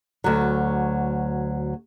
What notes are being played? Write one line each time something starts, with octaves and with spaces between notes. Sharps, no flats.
D2 F#3